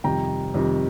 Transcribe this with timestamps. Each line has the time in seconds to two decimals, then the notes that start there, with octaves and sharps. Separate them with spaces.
0.04 F2 C3 D#3 G3 G5 A#5
0.54 F2 C3 D#3 G3